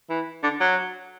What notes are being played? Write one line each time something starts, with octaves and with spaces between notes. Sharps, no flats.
E3
D3
F#3